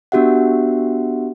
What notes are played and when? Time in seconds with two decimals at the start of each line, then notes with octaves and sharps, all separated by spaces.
0.12 B3 D4 F#4 G4 E5 F#5